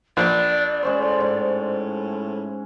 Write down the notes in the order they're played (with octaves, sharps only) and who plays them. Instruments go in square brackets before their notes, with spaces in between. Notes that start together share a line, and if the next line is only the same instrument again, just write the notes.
[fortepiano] A#1 [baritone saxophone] D4 [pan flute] D5
[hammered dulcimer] G#3 C#4 C5
[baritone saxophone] A2
[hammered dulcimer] G#2